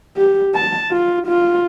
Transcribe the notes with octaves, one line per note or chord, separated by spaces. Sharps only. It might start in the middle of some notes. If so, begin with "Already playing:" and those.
G4
A5
F4
F4